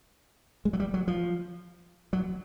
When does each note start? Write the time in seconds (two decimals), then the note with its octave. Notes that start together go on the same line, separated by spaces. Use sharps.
0.65 G#3
0.73 F#3
0.80 G3
0.94 F#3
1.08 F3
2.13 F#3